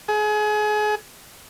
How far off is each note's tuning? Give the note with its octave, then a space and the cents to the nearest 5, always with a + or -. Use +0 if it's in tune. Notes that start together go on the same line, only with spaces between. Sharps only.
G#4 +30